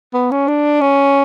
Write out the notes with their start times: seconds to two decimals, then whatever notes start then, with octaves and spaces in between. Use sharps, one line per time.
0.13 B3
0.31 C#4
0.48 D4
0.81 C#4